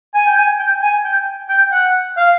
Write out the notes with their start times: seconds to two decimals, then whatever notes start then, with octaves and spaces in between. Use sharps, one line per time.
0.14 G#5
0.26 G5
0.36 G#5
0.59 G5
0.82 G#5
1.04 G5
1.49 G5
1.72 F#5
2.17 F5